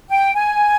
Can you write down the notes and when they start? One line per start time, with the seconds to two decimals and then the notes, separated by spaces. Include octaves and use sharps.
0.09 G5
0.35 G#5